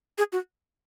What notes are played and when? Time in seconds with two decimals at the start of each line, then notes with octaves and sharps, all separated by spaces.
0.18 G#4
0.33 F#4